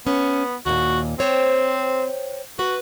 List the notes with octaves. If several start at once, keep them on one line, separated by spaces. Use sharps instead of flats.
B3 C#4
D#2 A#2 F#4
C4 C5 C#5 G5
F#4 B4